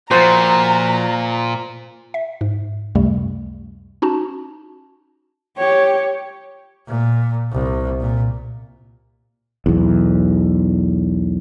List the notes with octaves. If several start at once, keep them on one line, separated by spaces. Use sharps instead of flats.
A#2 F3 F4 F#4 C5 A#5
E5
G#2
C#2 F#2 C3 G3 A3
C#4 D#4 F#4 A5
G4 C#5
A#2
C2
A#2
B1 E2